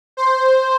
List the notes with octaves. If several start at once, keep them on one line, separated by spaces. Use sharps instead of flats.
C5